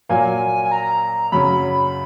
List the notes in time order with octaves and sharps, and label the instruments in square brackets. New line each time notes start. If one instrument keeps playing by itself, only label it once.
[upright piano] A#2 F#3 A#3 F4 [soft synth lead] G#5
[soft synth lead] G#5
A#5
[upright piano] F#2 C#3 F#3 C#4 [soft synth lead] B5